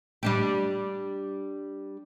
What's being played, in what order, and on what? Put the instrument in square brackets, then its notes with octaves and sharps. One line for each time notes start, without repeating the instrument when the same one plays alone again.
[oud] G3 D4 G4